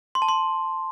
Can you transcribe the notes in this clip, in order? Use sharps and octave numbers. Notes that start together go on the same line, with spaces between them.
C6
A5
C6